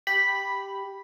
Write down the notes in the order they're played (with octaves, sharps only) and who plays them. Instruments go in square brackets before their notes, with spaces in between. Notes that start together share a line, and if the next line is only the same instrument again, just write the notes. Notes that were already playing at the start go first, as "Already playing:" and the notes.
[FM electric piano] G4 B5